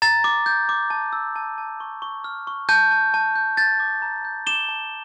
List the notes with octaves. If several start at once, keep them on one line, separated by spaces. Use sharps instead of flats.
A#5 A6
D6
G6
D6
A5
E6
A5
A5
C#6
C#6
F6
C#6
A5 G6
A5
A5
G6
G6 A6
D6
A#5
G6
D6 E7 G7
A5